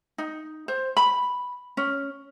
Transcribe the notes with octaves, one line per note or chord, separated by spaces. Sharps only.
D#4
C5
B5
C#4